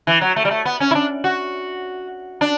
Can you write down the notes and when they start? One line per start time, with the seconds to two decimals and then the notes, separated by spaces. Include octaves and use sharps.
0.07 E3
0.21 F#3
0.36 A3
0.45 G3
0.51 A3
0.65 B3
0.80 C#4
0.91 E4
0.95 D4
1.24 F#4
2.41 D4